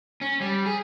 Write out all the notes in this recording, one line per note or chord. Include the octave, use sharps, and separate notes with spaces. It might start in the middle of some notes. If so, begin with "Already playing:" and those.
C#4
G3
G#4